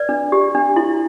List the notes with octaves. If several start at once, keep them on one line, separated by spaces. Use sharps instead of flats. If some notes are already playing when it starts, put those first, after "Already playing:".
Already playing: B4 D5
D4
G4
D4
E4